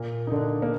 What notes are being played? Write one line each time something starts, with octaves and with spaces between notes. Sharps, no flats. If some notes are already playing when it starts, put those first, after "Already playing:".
Already playing: A#2 A#3
D#4
D3 D4
A#3